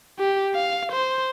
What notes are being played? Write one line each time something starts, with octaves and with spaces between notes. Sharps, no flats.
G4
F5
C5